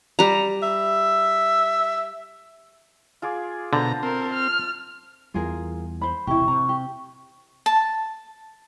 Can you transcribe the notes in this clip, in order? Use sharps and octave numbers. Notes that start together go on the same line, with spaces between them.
G3 A#5
E5
F4 G#4 D6
B2 D3 C5 A5 A#5
C4 A#4
F6
E2 G3 F4 G#4 A#4
C5 B5
E1 A1 C3 E4 G4 C#6
C3 A#5
G4
A5